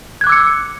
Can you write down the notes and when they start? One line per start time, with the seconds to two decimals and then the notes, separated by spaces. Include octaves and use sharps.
0.21 G#6
0.24 F#6
0.27 D6
0.29 E6
0.32 C#7